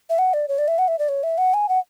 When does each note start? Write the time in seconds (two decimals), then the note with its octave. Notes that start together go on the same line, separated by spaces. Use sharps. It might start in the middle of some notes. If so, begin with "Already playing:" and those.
0.10 E5
0.18 F#5
0.33 D5
0.48 C#5
0.58 D5
0.68 E5
0.78 F#5
0.88 E5
0.99 D5
1.09 C#5
1.23 E5
1.38 F#5
1.54 G#5
1.69 F#5